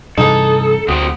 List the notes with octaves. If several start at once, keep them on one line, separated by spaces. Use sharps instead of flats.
G2 C3 E3 D#4 G#4 A4 D#6
D2 C4 F#4 G4 D#6